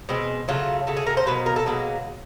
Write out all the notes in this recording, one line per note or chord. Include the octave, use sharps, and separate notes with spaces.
B2 G#3 C4
C#3 F#3 A3 F4
C#3 F#3 A3
G#4
A#4
C5
B2 F#3 A#3 B4
A#4
A4
B2 F#3 A#3 G#4